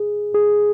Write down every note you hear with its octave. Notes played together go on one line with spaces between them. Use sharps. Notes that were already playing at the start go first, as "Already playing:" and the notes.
Already playing: G#4
G#4